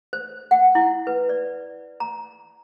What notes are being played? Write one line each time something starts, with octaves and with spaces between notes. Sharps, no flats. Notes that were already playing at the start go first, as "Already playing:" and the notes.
C5
F#5
E4
B4
D5
A#5